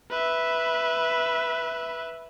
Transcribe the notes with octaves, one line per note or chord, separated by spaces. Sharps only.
B4 E5